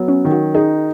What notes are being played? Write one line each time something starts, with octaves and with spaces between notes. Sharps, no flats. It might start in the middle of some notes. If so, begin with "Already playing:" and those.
Already playing: F#3 B3
C#4
D#3
F#4
D#4 G#4